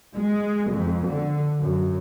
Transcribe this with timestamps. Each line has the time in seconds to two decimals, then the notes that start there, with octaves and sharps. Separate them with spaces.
0.15 G#3
0.71 F2
1.07 D3
1.59 F#2